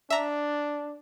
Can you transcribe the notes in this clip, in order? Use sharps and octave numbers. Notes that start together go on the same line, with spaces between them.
D4 E5 A#5